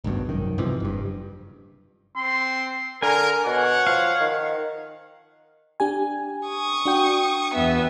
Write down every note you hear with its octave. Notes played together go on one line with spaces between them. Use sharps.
G#1 C#2 G2 B2
C2 F#2 D#3
G#2 C3 E3 F3
F#1 G2
C4 C6
D3 A#4 G#5
B2 C#5 F#5
F3 F5
D#3
D4 G4 G#5
C#6 D#6
D4 F#4 G5
E2 B3 E5